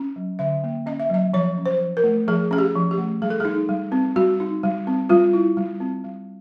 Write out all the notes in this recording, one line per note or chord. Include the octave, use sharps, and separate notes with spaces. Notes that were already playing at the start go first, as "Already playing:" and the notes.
Already playing: C#4
F#3
D3 E5
A#3
C#4 D#5
E5
F#3 D#5
F3 C#5
C#4
C5
F3
A#4
A3
F3 G#4
C#4 G#4
G4
F3
G4
A3
G3 G#4
A4
D#4 G#4
G3
C4
G3 F#4
D#4
G3
C4
G3 F4
E4
G3
C4
G3